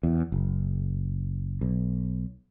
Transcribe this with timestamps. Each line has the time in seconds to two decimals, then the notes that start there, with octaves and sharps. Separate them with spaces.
0.03 E2
0.32 F#1
1.61 B1